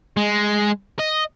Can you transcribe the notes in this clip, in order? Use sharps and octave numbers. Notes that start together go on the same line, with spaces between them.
G#3
D#5